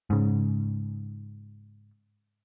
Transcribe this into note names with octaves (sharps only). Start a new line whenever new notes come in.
G#2 C#3